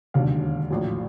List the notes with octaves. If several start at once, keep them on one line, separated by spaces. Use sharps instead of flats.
E1 D#2 D3 F#3 F5
A#1 A2 F#3